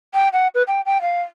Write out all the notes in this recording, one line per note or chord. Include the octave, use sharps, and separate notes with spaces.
G5
F#5
B4
G5
G5
F5